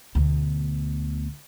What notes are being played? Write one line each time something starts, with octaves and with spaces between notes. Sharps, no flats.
D2 B2